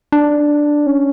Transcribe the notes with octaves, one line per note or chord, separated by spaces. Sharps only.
D4
C#4